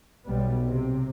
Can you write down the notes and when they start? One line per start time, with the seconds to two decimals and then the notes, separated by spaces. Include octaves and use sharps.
0.24 B1 G3 B3
0.66 C3 C4